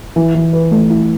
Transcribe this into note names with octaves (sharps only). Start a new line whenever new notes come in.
E3
E3
B4
A3
E4